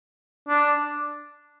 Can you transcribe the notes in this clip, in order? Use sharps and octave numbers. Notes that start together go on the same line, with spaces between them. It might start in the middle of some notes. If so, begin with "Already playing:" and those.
D4